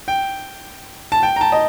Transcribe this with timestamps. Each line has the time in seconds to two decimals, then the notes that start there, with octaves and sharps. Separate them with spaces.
0.08 G5
1.12 A5
1.23 G5
1.36 A#5
1.41 A5
1.52 D#5